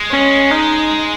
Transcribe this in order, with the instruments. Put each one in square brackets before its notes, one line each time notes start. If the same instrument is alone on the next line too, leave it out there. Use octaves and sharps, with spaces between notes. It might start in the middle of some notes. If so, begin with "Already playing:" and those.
Already playing: [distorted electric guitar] G#3
[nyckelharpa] C#4
D#4